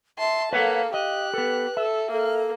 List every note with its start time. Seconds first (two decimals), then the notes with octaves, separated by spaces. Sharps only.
0.19 E5 A5 C6
0.53 A#3 A4 B4 C#5 F5 F#5
0.94 G4 D#5 F#6
1.34 B3 A4 B4
1.77 A4 E5
2.12 A#3 A4